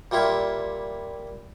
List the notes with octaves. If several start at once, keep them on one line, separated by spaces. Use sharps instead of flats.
A#2 G3 E4 F4